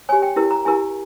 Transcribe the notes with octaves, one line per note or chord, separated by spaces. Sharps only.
G4 C#5 G#5
G5
E4 G4 A#4
A#5
E4 G4 A#4 G#5